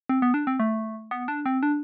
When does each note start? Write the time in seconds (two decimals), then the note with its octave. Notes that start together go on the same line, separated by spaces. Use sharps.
0.09 C4
0.22 B3
0.34 D4
0.47 C4
0.60 A3
1.11 B3
1.28 D4
1.46 C4
1.63 D4